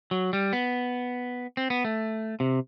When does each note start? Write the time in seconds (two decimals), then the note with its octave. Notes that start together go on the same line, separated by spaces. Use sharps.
0.11 F#3
0.33 G3
0.53 B3
1.57 C4
1.70 B3
1.85 A3
2.40 C3